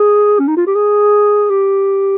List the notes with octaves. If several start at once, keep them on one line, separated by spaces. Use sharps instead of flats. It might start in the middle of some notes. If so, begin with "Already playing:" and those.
Already playing: G#4
C#4
D#4
F4
G4
G#4
G4